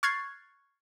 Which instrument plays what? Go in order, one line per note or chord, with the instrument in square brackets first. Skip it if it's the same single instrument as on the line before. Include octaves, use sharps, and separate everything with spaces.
[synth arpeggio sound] C#6 F6 F#6 G#6 A6 C7